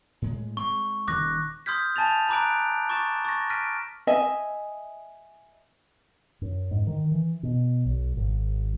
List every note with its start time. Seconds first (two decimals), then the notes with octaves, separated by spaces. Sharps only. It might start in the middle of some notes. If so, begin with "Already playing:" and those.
0.22 A2 G#3
0.57 G#3 C4 C#6
1.08 D#1 D#3 D6 F#6 A#6
1.66 C6 D#6 F6 G6 G#6 B6
1.96 G#5 A5 G#6 A6 F7
2.29 A#5 B5 D6 F#6 D7
2.90 C#6 D6 A6 E7
3.25 C#6 A6 A#6
3.50 F6 A#6 B6 D7 D#7
4.07 D#5 E5 G#5
6.41 F#2
6.71 G#2
6.87 D#3
7.12 E3
7.43 B2
7.85 B1
8.17 G#1